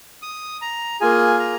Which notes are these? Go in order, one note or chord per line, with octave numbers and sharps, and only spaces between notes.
D#6
A#5
A#3 F4 G#4 G#5
A#5